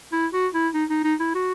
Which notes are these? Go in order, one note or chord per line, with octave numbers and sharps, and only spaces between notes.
E4
F#4
E4
D#4
D#4
D#4
E4
F#4